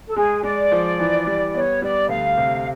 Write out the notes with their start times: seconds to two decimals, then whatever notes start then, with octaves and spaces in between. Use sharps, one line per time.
0.08 A4
0.16 G#3 G#4
0.43 G#3 D5
0.71 F3
0.99 E3
1.27 G3
1.54 B3 C#5
1.82 G3 D5
2.09 D2 F5
2.37 C3